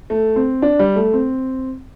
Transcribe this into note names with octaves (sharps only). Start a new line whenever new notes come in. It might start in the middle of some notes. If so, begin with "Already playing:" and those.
A3
C4
D4
G3
A3
C4